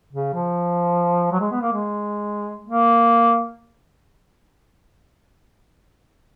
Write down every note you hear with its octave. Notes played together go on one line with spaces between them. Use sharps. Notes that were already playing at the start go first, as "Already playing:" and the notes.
C#3
F3
F#3
G#3
B3
A#3
G#3
A#3